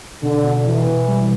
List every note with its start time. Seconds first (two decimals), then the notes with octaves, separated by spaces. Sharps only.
0.23 B2 D3
0.45 B2
0.66 B2 E3
0.87 B2
1.09 G3